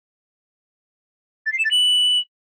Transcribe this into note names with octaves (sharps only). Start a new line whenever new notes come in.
A6
C7
E7
A6
F#7